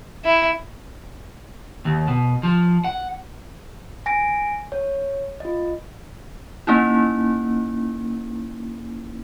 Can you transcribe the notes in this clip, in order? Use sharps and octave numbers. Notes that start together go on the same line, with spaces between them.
E4
D#2
B2
F3
F#5
G#5 A#6 D7
C#5
F4 D#5
A#3 C#4 D#4 E4